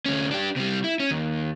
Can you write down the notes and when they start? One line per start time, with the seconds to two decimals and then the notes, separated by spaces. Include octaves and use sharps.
0.06 D2 C#4
0.31 D4 G4
0.56 C3 G3
0.84 E4
1.00 C#4
1.11 D#2